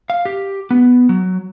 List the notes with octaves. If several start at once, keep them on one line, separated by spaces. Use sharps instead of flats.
F5
G4
B3
F#3